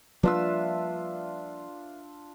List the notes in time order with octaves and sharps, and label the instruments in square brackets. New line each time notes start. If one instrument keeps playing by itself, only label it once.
[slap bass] F3 G3 A#3 [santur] D4 F4 E6 [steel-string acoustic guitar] B4 E5